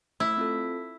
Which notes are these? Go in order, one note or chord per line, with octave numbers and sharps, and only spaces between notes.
A3 E4
C4 F4 A4